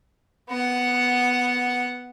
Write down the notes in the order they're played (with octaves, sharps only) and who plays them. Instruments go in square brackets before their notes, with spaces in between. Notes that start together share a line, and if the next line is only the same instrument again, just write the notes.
[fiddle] B3 F#5